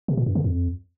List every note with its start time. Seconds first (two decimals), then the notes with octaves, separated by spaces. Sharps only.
0.08 C3
0.17 A#2
0.26 F#2
0.35 C#3
0.44 F2